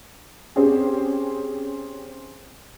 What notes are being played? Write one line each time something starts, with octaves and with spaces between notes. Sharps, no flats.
C4 C#4 G4 G#4